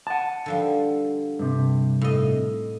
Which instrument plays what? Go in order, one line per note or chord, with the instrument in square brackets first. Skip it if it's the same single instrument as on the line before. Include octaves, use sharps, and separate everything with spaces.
[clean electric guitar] F#5 A5
[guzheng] D3 F3 G3
[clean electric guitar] G2 C3
[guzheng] A2 D#5